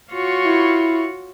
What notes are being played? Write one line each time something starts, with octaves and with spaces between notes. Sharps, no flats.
F4 F#4 C#5
E4